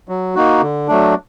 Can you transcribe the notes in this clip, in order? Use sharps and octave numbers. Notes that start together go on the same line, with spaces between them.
F#3
A#3 D#4 F#4
D3
F#3 A3 D4